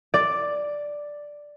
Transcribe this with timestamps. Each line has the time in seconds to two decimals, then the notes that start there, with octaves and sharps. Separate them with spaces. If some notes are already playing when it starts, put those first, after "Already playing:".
0.14 D5